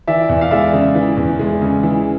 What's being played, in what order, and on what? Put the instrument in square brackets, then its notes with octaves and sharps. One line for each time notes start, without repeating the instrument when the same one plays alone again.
[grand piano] E3 D5 E5
E2
F5
G#3 D5 E5
C#3
E3
E2
G#3
C#3
E3